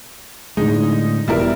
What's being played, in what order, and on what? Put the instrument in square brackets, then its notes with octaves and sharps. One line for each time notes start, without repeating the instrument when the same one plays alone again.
[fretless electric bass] A2 D3 G#3 [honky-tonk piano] D#4
[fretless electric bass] E1 B2 [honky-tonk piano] G3 E4 A#4